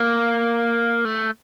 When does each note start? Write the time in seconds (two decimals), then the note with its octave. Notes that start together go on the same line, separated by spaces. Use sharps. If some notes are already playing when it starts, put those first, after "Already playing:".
Already playing: A#3
1.05 A3